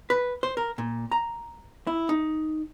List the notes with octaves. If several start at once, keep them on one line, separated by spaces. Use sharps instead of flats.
B4
C5
A#4
A#2
A#5
E4
D#4